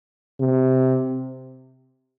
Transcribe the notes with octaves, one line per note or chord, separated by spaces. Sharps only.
C3